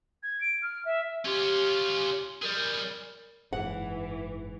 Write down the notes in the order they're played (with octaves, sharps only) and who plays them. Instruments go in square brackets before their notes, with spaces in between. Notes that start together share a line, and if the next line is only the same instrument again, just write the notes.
[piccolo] G#6
D7
F6
E5
[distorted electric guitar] C#4 F4 [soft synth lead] G4
[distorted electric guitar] G3 G#4 [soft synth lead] A#4
[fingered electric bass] F#1 G#2 [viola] E3 [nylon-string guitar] F#5